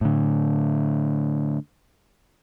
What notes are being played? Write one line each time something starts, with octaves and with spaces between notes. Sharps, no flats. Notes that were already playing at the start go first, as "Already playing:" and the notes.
A2 D3